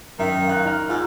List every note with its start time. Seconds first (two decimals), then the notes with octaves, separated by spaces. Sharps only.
0.19 F#2 D#3 E5
0.48 F5 F#6
0.64 D#4 A#5 F6
0.89 G#2 F4